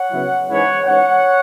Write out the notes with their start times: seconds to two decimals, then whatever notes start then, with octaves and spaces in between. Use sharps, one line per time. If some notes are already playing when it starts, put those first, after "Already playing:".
Already playing: C#5 F#5
0.12 C#3 F#3 B3 E4
0.49 G#2 E3 G#3 C#4 E4 C#5 F#5
0.87 G#2 E3 C#4 C#5 F#5